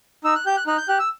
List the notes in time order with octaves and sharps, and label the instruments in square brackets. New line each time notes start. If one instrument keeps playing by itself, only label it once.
[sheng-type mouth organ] D#4 E6
F#6
G4 G6
F#6
D#4 F#6
G6
G4 F#6
E6